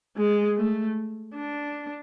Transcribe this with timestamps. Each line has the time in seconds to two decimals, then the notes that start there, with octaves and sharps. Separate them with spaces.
0.17 G#3
0.57 A3
1.35 D4